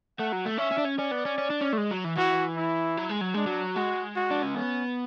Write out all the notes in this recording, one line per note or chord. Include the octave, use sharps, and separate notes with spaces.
A3 F#5
F#3
A3
C#4 E5
C#4
D4
C#4
C#4 D5
B3
C#4
C#4
D4
C#4
A3
G#3
F#3
E3
E3 F#4
E4
F#3
G#3
F#3
G#3 D4
F#3
G#3 F#4
F#4
D4
C#4
B3 C#4